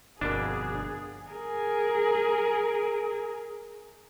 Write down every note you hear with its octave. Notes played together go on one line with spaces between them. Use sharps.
G1 F2 B2 A#3 D4 G#4
G#4 A#4